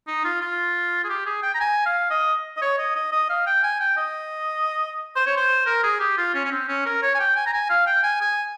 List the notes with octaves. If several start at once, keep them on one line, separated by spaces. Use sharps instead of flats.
D#4
F4
F4
G#4
G4
G#4
G5
A#5
G#5
F5
D#5
D#5
C#5
D#5
D#5
D#5
F5
G5
G#5
G5
D#5
C5
C#5
C5
A#4
G#4
G4
F4
C#4
C#4
C4
C#4
A#4
C#5
G#5
G5
G#5
A#5
G#5
F5
G5
G#5
G#5